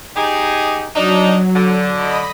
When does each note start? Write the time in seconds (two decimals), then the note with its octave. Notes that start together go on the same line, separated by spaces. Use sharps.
0.16 D#4 G4 G#4
0.95 F#3 D4 D#4
1.54 D3
1.93 D#5 B5